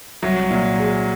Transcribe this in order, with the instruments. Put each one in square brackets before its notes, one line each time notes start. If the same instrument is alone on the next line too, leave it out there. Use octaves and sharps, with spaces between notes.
[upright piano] C2 [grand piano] F#3
[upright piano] A#2
G#3